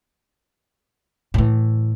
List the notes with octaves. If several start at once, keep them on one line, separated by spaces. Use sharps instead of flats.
A2 E3